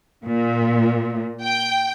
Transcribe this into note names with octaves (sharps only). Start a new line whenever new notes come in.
A#2
G5